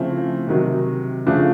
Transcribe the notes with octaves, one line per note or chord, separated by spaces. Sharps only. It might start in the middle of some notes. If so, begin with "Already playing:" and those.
Already playing: C#3 F3 A3 C4 E4
C3 D#3 F#3
C#3 F3 A3 D4